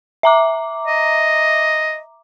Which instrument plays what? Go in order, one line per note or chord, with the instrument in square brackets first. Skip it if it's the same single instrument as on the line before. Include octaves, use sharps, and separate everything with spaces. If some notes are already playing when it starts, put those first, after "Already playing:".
[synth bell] E5 A#5 D6
[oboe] D#5